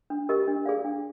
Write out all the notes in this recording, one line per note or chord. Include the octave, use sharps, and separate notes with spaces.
D4
G4 A#4 D#5
D4
G#4 D5 F5
D4